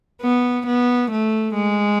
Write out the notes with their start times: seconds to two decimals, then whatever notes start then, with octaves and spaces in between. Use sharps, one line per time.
0.22 B3
0.67 B3
1.11 A3
1.55 G#3